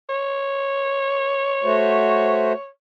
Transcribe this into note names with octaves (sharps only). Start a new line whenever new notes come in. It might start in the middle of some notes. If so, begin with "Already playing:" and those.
C#5
A3 F#4 C5